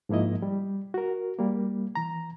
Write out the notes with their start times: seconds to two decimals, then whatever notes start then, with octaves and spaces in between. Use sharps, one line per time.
0.09 G#2 F3 A#3 E4 D#5
0.42 G3
0.94 F#4 A#4
1.38 G3 A#3
1.95 E3 A#5